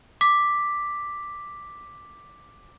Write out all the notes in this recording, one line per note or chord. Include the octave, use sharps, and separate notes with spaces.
D6 B6